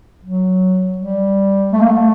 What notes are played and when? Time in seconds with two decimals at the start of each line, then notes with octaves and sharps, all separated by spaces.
0.23 F#3
0.98 G3
1.73 A3
1.81 A#3
1.89 A3